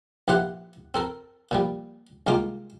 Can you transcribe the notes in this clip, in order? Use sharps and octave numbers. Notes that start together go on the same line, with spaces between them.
A#1 E3 G4 C5 F5 F#5
C4 A4 A#4
A#2 F3 G3
C2 D#3 G#3 A#3 F4 D6